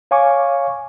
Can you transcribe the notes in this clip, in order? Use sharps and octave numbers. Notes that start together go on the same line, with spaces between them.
C#5 F5 G#5 C#6 D6